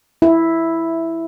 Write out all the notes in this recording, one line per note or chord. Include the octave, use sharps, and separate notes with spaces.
E4